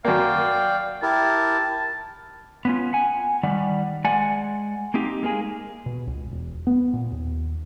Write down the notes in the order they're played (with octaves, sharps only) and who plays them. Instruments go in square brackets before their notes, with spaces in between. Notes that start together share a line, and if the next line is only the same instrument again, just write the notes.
[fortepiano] F#2 A#3 [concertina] D5 G5 [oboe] F5
[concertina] E4 G4 A#4 [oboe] A5
[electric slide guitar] B3 C#4 F4
F#5 G#5
D#3 G3 D5 F#5
G#3 D5 F#5 G#5
A#3 C4 D#4 G4
G#3 A#3 D4 G#4
[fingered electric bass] B2
C#2
E1
B3
A#2
D#2